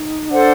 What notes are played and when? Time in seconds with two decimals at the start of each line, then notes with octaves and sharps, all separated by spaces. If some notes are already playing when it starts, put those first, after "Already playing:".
Already playing: D#4
0.30 D4 A4 C5 F#5